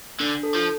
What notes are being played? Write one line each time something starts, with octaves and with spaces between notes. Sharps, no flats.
D3 D4
A4
F3